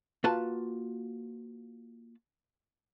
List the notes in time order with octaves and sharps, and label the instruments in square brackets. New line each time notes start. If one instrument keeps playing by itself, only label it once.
[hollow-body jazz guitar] A#3 F4 F#4 B4 A5